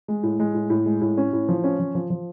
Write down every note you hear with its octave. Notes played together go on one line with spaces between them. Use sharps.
G#3
A2
G#3
A2
A2
G#3
A2
C#4
A2
F3
C#4
F3
F3
F3